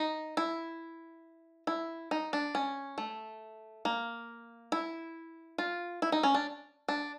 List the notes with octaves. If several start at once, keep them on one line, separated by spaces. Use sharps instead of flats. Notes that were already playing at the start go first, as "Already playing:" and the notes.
Already playing: D#4
E4
E4
D#4
D4
C#4
A3
A#3
E4
F4
E4
D#4
C#4
D4
D4